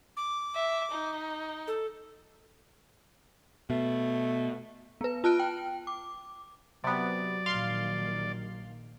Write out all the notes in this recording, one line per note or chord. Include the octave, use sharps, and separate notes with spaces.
D6
E5
D#4
A4
B2 A3
B3 B4
F4 A5 F6 F#6 D7
G5
D6
C3 F#3 B3 D5
A#1 D#3 F5 C6